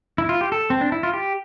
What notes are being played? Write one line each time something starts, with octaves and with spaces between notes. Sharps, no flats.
E4
F4
G4
A4
C4
D4
E4
F4
G4